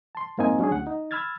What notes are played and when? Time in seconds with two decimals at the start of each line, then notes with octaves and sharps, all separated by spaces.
0.15 A5 C6
0.38 F2 G#2 A#3 C4 D#4 G#5
0.59 F#3 C#4 D4 G#4
0.71 D2 F#5
0.87 D#4
1.11 B5 E6 F6 G#6 A6